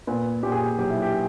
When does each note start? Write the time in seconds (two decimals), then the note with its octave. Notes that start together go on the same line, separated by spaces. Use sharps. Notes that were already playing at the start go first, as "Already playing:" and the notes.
0.07 A#2 B3
0.43 A#2 G4
0.52 G#4
0.62 G4
0.78 B1 G4
0.90 E4
1.02 G4